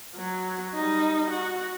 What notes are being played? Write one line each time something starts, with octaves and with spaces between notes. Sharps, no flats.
F#3
G3 D#4
F#4